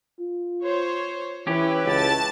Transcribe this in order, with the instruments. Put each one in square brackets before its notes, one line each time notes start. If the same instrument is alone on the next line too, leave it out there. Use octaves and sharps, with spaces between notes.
[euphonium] F4
[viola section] C5 C#5
[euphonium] E3 [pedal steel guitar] C#4 G4 [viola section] E4 B4
[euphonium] C#2 [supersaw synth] A5 A6